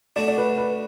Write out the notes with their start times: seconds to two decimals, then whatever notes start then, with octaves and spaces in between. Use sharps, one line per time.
0.16 A3 D4 F#4 D5
0.28 D5
0.38 B4
0.58 B4